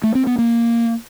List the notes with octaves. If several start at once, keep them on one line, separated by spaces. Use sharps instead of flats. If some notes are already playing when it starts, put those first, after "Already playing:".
A3
C4
B3
A#3